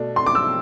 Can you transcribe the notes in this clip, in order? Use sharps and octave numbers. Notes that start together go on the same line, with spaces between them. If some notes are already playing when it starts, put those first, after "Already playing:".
Already playing: B2 A3 D4
C6
D6
E6